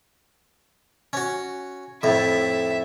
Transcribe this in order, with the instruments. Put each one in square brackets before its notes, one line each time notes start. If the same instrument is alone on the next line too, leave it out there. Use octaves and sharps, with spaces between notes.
[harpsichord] C#4 F#4
[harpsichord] F2 A2 [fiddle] E5